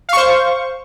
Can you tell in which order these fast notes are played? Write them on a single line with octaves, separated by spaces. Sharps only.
F5 C#6 C5